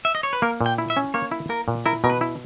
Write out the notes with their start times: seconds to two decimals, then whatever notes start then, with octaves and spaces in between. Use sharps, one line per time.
0.05 E5
0.15 D#5
0.23 C#5
0.33 B4
0.42 A#3 A#4
0.61 A#2
0.66 G5
0.78 E4
0.90 E5
0.97 C#4
1.14 A#3 C#5
1.31 E4
1.49 A#3 A#4
1.68 A#2
1.86 E4 A#4
2.04 B2 A#4
2.10 B4
2.21 E4